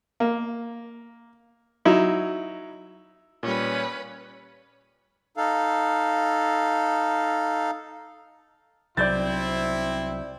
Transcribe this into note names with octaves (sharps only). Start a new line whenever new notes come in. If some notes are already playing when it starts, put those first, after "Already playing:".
A#3
F#3 D#4 E4
A#2 G3 C#4 B4
D#4 A4 F5
C2 F#3 C4 E4 D5 G6 A6